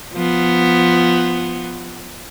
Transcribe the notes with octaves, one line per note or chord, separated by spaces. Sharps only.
F3 B3